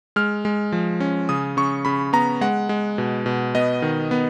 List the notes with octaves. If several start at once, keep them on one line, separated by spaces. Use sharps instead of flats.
G#3 F6
G#3
F3
C#4
C#3 D#6
C#3 C#6
C#3 B5
B3 A#5
G#3 F#5
G#3
B2
B2
B3 D#5
D#3
B3